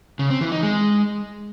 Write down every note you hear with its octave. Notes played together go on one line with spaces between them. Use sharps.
C#3
C4
E3
D#4
G#3